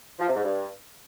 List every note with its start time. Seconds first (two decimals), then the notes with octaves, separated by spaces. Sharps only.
0.19 F3
0.28 C3
0.36 G#2
0.44 G2